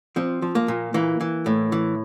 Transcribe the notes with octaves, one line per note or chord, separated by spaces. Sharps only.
F3 C4
F3
A#3
A#2
E3 A#3
E3
A2
E3